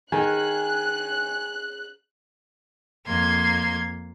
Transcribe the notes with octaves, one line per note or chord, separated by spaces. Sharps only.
D#3 G#4 G#5 F#6
F2 A#3 C6 G#6